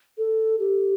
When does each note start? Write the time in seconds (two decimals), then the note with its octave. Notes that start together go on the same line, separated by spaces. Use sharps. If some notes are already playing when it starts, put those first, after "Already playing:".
0.18 A4
0.59 G4